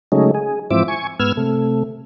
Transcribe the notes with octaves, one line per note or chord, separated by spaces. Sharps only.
C#3 F#3 G#3 A3 C#4 D#4
G#4
G#2 E3 F3 C4 E5 D6
G#5 C#6
G#2 B3 E6 F6 G#6
C3 A3